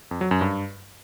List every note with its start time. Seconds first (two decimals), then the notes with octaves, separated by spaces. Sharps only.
0.11 F2
0.21 F#3
0.31 F#2
0.41 G2